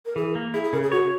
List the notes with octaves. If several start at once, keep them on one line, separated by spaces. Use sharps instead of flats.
A#4
E3 G#4
A#3
E4 G#4
G#4
C#3 A#4
G#4
F#4 C#5